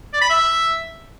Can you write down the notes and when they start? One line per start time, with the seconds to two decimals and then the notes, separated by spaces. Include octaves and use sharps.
0.13 D5
0.21 B5
0.30 E5